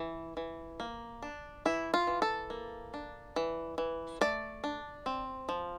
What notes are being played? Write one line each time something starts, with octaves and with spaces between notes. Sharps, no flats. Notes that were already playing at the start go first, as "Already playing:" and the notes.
Already playing: E3
E3
A#3
D4
E3 E4
F4
E3
A4
A#3
D4
E3
E3
A3 D5
D4
C4
F3